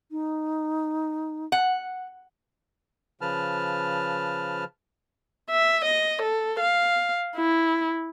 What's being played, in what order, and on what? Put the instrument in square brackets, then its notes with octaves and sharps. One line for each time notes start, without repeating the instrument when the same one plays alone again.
[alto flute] D#4
[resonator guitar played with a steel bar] F#5
[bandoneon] C#3 F3 B4 A5 F6
[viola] E5
D#5
A4
F5
E4